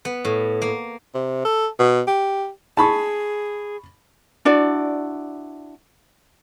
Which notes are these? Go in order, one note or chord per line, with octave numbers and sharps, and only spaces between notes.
B3
A2
A#3
C3
A4
B2
G4
G#4 A5 B5 C#6
D4 E4 F#4 D5